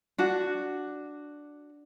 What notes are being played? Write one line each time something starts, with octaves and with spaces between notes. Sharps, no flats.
D4 F#4